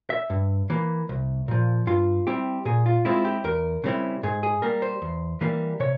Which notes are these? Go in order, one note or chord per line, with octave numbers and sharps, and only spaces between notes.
E5
G2
E3 A#3
C2
A#2 F3
G2 F4
G3 C4 E4 G4
A#2 G#4
F4
G#3 C4 E4 F4
G4
E2 A#4
C#3 G3 C4 E4
G#2 G#4
G#4
G3 A#3 A#4
C5
E2
E3 G3 A#3
C3 C#5